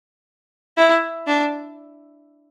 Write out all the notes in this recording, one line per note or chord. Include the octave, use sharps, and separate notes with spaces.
E4
D4